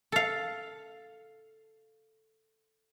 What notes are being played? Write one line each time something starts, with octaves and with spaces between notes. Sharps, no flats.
A4 F5